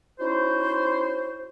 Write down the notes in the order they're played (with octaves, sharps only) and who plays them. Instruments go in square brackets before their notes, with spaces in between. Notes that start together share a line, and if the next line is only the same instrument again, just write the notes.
[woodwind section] C#4 D#4 E4 F#4 C5